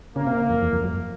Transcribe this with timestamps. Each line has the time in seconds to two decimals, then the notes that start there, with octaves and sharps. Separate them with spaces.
0.15 C#3 A#3
0.27 C3
0.50 F2
0.62 E2
0.72 F2
0.84 F#2